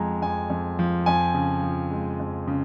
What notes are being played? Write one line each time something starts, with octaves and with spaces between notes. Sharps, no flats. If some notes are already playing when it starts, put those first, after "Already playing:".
Already playing: F2 F3 G#3 G#5 A#5
F2 G#5
F2
F3
F2 G#5
C#3
F3
G#3
F2
C#3